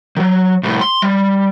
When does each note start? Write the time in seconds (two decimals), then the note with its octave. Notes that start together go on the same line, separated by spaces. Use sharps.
0.17 D#3 F#3
0.63 C2 A2
0.81 C6
1.02 G3